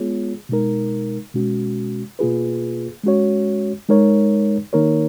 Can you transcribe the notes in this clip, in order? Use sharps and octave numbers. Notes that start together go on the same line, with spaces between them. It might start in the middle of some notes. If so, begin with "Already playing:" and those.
Already playing: G#3 B3 F4 G#4 C#5
B2 G#3 D#4 A#4
B2 G#3 C#4 F#4
B2 A#3 F4 G#4 B4
G#3 C#4 F#4 C#5
G#3 D#4 A#4 C#5
D#3 A#3 D#4 A#4 C#5